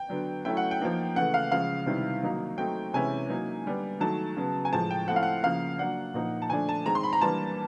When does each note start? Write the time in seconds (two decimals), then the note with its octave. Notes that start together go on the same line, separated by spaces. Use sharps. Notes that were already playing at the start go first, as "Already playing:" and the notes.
Already playing: G5
0.08 D3 F#3 B3 D4
0.45 F#3 A3 C#4 E4 G5
0.57 F#5
0.71 G5
0.80 F3 A#3 D#4
1.16 C#3 E3 A3 F#5
1.34 F5
1.52 C#3 F3 G#3 F5
1.86 C3 D#3 G3 B3 E4
2.23 D#3 F#3 A#3 D#4
2.58 F#3 A3 C4 D#4 G5
2.94 C3 E3 G#3 C#4 E4 G#5
3.29 F#3 A#3 D#4
3.66 D3 G3 B3 D4
4.00 D#3 F#3 A3 A5
4.36 C#3 F#3 B3
4.65 G#5
4.72 A2 F3 G#3 A5
4.91 G5
5.08 F3 A3 C4 E4 F#5
5.16 F5
5.23 F#5
5.43 C#3 F3 A#3 F5
5.78 F#3 A#3 D4 F#5
6.14 A#2 F3 A#3 D#4
6.42 A5
6.50 D3 F3 A3 D4 G#5
6.69 A5
6.86 D#3 G#3 C4 A#5
6.95 C6
7.03 B5
7.13 A#5
7.21 E3 G3 A#3 D4 A5